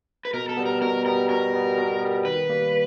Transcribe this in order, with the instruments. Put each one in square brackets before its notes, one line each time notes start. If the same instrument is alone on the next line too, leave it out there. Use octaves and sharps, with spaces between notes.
[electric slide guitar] B4
[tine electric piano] B2 [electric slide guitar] A#4
[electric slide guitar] A4
[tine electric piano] G3 B3
[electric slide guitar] A#4
[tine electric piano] B2 [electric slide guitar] A#4
[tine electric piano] G3 B3 [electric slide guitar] A#4
[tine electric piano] B2 [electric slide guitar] A#4
[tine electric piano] G3 B3
B2
G3 B3
[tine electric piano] D#3 [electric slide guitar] B4
[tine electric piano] G3 A#3